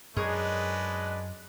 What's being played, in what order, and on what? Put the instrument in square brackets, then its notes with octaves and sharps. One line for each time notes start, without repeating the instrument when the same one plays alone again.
[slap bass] F#2 [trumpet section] G#3 D4 B4 [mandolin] G#4 A#4 C#5 [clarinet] D#5